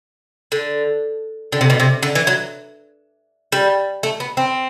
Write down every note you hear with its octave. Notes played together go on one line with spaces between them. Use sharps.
D3
D3
C3
B2
C3
D3
E3
F#3
G3
A3
B3
C4